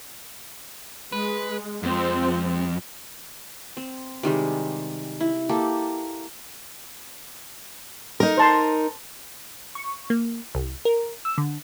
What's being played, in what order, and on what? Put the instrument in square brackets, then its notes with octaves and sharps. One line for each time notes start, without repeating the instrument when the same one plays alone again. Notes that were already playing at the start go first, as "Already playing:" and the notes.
[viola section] G#3 [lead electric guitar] B4
[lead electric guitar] F2 [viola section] F3 G#3 C4
[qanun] C4
C3 D#3 G3 G#3
E4
A#3 G4 A4
[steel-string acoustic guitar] D#4 A#4
[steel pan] C5 A5 C6
[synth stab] C#6
A#3
C2
A#4
E6
D3